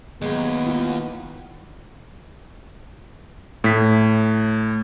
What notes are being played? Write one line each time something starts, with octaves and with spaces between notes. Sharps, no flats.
D#2 F#3 G#3 B3
E4 F4 F#5
A2 B6